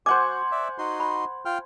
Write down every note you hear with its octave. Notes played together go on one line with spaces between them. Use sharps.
F#4 C5 F#5 G#5 D6
D5 E5
D#4 F#4 C6
B5
F4 G5 F6